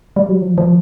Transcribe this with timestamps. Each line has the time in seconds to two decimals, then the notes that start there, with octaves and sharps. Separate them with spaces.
0.16 G3
0.29 F#3
0.41 F3
0.58 F3